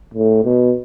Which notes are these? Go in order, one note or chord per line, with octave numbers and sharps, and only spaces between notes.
A2
B2